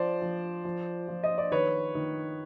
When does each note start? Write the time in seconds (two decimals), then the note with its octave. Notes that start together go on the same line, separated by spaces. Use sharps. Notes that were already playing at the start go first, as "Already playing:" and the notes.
Already playing: F3 C5 D5
0.21 F3
0.64 F3
1.08 F3
1.23 D#5
1.38 D5
1.51 D#3 B4 C#5
1.95 D#3